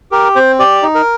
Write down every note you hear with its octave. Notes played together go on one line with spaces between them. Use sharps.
G4 A#4
C4 C5
G4 D5
D#4
A#4